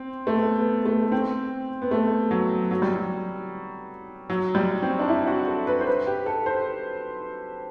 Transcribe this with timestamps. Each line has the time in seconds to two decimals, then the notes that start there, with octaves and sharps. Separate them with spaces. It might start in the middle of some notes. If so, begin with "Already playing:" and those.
Already playing: C4
0.27 A3
0.34 B3
0.59 B3
0.86 A3
1.12 C4
1.82 B3
1.91 A3
2.31 F#3
2.71 F#3
2.82 G3
2.94 F#3
4.30 F#3
4.55 G3
4.82 C4
4.99 D4
5.09 E4
5.28 F#4
5.48 A4
5.67 B4
5.81 C5
5.87 B4
6.06 G4
6.26 A4
6.46 C5